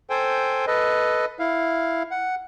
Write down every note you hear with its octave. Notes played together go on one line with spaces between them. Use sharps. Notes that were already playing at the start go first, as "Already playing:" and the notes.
A4 C5 G5 G#5
A4 B4 D#5
E4 F5
F#5